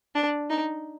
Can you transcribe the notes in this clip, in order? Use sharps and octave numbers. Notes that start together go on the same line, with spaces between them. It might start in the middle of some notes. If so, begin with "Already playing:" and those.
D4
D#4